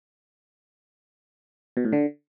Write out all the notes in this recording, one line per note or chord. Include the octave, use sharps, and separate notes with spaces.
B2
A2
D3